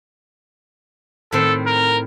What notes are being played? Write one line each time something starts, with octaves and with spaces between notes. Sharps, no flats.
A2 D#3 C4 A4
A#4